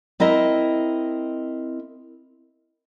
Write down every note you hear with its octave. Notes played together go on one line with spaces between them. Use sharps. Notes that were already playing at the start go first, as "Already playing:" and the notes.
C4 E4 A#4 D#5